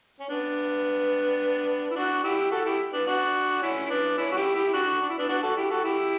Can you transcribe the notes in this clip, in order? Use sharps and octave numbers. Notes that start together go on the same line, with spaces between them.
C#4
B3 D4
E4
D4 F#4
E4 G4
F#4 A4
E4 G4
B3 D4
D4 F#4
C#4 E4
E4
B3 D4
C#4 E4
F#4
E4 G4
E4 G4
E4
D4 F#4
D4
E4
B3 D4
D4 F#4
F#4 A4
E4 G4
F#4 A4
E4 G4